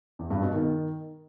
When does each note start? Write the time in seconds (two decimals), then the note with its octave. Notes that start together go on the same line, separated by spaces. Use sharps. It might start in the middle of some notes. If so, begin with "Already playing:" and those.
0.19 E2
0.30 G2
0.42 B2
0.53 D#3